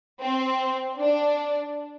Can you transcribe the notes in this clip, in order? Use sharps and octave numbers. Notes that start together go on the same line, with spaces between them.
C4
D4